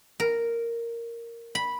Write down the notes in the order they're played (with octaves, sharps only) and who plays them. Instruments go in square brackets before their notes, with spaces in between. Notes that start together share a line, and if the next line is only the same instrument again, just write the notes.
[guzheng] A#4
B5